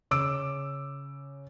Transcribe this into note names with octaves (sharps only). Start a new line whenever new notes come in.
C#3 D6 E6 D7